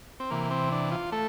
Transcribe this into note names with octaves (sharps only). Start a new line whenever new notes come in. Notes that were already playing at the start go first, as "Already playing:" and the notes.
C4
C3 E3 A#3
C4
D4
F4
A3 A4